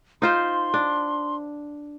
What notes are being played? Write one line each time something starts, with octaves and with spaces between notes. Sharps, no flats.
D#4 F4 C5 C6
D4